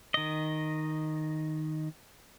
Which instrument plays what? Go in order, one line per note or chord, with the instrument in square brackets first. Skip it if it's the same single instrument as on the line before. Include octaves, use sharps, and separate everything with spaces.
[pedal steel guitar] D#3 D#5